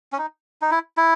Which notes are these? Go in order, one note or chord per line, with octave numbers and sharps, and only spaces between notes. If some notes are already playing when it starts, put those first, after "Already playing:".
C#4
D#4
D#4
E4
E4